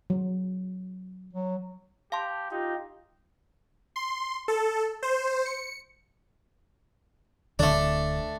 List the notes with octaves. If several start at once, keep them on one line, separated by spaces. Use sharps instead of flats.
F#3
F#3
G4 F5 A5 C6
D#4 F4 G4
C6
A4
C5
C#7
D1 D3 A3 D4